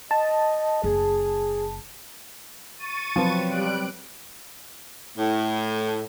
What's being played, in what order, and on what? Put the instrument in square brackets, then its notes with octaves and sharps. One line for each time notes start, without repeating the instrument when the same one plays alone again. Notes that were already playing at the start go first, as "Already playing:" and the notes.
[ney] D#5 [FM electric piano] A5
[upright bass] F#1 [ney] G#4
[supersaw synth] C#6 A6 D#7
[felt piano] F3 [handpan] F#3 C4 B4
[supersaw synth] G3 F#6 D7
[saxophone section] A2